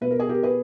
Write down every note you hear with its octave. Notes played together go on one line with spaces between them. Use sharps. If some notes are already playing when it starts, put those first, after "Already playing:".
B2 B4
A#4
G#4
G4 A#4
G#4 B4